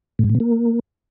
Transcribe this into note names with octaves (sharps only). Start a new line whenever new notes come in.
A2
G#2
A2
B2
A#3